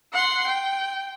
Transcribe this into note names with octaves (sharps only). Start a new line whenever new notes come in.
F#5 C6
G5